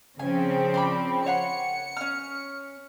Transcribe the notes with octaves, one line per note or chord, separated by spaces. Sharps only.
C#3 F3 C4 G#5
C5 D5 B5
C#5 F#5 C6 C#7
C#4 F6